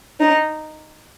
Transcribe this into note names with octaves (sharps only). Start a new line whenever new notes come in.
D#4